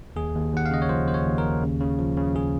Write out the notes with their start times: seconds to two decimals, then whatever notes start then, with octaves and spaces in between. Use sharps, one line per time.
0.16 D#2 G#4
0.35 D#2
0.53 D#2 F#5
0.66 F5
0.71 C#3 D#5
0.82 C#5
0.89 F3 C5
1.08 D#2 C5
1.14 C#5
1.26 D#2
1.38 A#4
1.44 D#2
1.63 C#3
1.81 C#3
1.99 F3
2.17 C#3
2.36 C#3 G#4